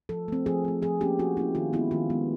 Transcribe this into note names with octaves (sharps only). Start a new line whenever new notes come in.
F3 A4
A3 C4
F3 G#4
A3 C4
F3 G#4
A#3 C#4 G4
F3 F#4
A#3 C#4 E4
D#3 F4
G#3 B3 E4
D#3 F4
G#3 B3